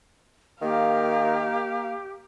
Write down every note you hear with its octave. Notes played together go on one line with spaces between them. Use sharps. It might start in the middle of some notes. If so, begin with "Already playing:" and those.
D#3 A#3 G4 F5